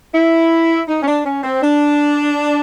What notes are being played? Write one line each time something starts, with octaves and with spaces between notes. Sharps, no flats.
E4
D#4
C#4
D4
C#4
C4
D4